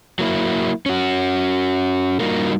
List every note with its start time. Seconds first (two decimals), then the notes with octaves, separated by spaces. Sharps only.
0.19 F#3 A#3 E4
0.86 C#4 F#4
2.20 G3 A#3 D#4 F4 F#4 A#4